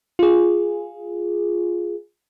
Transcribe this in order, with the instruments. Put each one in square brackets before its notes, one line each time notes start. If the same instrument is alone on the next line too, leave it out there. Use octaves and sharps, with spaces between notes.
[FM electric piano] F4 G#4